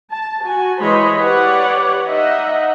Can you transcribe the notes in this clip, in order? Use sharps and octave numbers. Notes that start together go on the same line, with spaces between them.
A5
F#4 G#5
E3 G#3 C5 C#5 D#5 B5
G4 B4 C#5 D5 F#5
D#4 D#5 E5 F#5